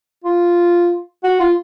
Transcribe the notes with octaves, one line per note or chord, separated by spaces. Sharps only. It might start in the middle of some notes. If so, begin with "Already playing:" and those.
F4
F#4
F4